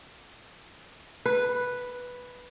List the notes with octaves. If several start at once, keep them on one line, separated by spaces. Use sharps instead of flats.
B4